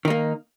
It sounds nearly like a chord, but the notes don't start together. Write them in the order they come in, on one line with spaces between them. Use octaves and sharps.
D#3 D#4 A#3